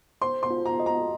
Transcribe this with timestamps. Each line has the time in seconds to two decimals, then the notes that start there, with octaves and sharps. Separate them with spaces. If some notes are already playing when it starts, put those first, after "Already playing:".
0.22 C5 C6
0.43 C6
0.50 F4
0.66 A#5
0.80 D#5
0.86 A#5